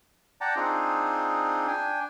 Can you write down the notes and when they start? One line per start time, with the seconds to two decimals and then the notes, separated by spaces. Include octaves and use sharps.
0.41 D5 F#5 G5 A5 A#5
0.56 C4 D4 D#4 F4 G#4
1.67 D4 G5 G#5